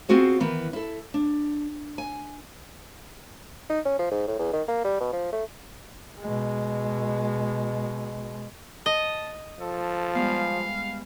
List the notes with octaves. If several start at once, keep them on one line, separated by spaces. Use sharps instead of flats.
B3 C4 F4 F#4 G#4 C5
D#3 E3 B3
E4 A4
D4
G#5
D#4
C#4
F3
G#2
A2
E2
D#3
A#3
G3
B2
F3
A3
B2 G#3
D#5 A5
F3 A4
G3 G#3 B3 F5